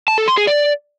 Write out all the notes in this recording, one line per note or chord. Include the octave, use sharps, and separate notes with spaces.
A5
A4
C6
G#4
D5